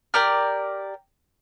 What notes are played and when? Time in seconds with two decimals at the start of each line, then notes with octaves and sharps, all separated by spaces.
0.14 G4 A#4 D5 F6